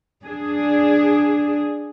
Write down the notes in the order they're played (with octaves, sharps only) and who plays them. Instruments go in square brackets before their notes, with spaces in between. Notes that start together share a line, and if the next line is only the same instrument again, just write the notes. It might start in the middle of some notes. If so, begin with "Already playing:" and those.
[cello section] D4 G#4